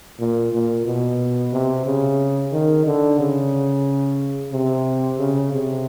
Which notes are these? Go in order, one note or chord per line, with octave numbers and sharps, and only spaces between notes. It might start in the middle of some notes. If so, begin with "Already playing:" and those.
A#2
A#2
B2
C3
C#3
D#3
D3
C#3
C3
C#3
C3